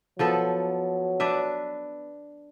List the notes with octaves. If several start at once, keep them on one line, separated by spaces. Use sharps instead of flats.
F3 F#3 B3 A4
D4 B4 E5